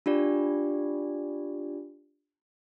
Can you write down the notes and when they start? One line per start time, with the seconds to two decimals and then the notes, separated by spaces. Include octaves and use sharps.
0.06 D4 F4 G4 D5